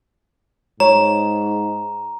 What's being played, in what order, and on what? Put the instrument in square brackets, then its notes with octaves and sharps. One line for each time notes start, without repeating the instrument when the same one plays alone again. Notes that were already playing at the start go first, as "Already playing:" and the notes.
[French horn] G#2 [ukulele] C#5 [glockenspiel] A#5